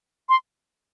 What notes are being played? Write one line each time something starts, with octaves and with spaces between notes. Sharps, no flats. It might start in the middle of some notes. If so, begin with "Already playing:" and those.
C6